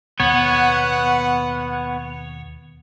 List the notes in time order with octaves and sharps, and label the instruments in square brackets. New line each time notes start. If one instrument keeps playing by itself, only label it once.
[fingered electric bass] D#2 B2 [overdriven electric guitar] B3 [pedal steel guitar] C#5 [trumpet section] F#5